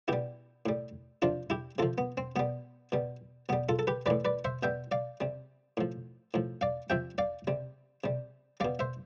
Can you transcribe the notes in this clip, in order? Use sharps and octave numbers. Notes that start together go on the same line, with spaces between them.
B2 G3 E4 G4
A2 G3
C3 F3 D4 F4
E4 G4
C3 F3 F4 A4
B3
C4
B2 G3 B3
B2 G3
B2 G3 B3
F4 A4
A4
G4 B4
A2 E3 G3 B4 D5
B4 D5
C5 E5
B2 G3 E5 G5
D5 F5
C3 G3
A2 F3
A2 F3
D5 F5
C3 F3 E5 G5
D5 F5
C3 G3
C3 G3
B2 G3 D5 F5
C5 E5